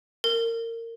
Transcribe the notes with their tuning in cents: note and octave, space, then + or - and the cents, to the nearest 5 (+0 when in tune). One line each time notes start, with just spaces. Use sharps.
A#4 -20